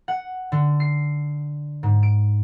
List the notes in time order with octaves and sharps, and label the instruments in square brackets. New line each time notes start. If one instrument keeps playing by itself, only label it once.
[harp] F#5
D3
C7
G#2
D7